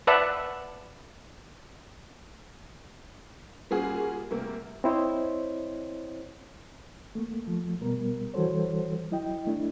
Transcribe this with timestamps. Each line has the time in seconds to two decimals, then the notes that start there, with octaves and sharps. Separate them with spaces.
0.07 B4 D5 E5 F#5 A5
3.71 G3 A#3 C#4 F4 F#4 G#4
4.30 C3 G3 A3 A#3
4.84 C4 E4 C5 C#5 D#5
7.15 A3 A#3
7.46 F3 A3
7.81 B2 G3 B3 A#4
8.34 E3 G3 F#4 A4 C5 C#5
9.11 F#3 E4 D#5 G5
9.47 A3 D4 E4